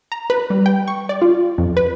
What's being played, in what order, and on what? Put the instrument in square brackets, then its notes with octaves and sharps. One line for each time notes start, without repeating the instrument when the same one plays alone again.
[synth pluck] A#5
B4
G3
G5
C#6
D5
F4
F2
B4